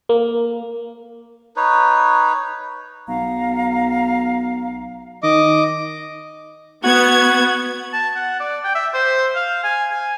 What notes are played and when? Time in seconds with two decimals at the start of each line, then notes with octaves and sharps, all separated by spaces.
0.09 A#3
1.56 D#4 B4 C#5
3.08 B1 F5 F#5 A#5
5.23 D#3 D#5 D6
6.84 B3 F#4 G#6
7.93 A5
8.16 F#5
8.40 D5
8.64 G5
8.75 E5
8.94 C5
9.35 F5
9.64 G#5
9.91 G#5